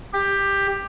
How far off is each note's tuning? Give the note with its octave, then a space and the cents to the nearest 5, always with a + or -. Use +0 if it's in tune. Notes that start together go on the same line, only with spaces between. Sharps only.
G4 +15